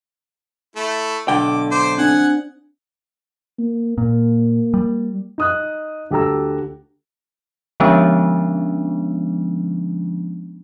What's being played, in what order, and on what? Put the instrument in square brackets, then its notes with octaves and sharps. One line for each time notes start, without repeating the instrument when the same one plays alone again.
[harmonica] A3 E4
[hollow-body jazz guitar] B1 D3 G5 [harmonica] D6
[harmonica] C5 D6
[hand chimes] C4 D4 [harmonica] F#5 G#5
[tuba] A#3
[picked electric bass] A#2 [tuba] A#3
[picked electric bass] G3
[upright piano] D#4 D#6 F#6
D2 G4 A4 A#5 E6
[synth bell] D3 F3 G#3 B3 C#4 D4